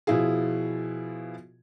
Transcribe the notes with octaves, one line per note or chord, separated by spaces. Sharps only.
B2 F3 E4 F4 G#4